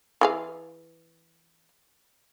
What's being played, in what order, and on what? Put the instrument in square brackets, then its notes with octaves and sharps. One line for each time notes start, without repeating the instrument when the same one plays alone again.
[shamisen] E3 G#4 F5